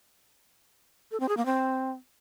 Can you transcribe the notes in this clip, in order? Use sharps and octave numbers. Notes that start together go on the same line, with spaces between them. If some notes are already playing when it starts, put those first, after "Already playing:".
A4
C4
G#4
A#3
C4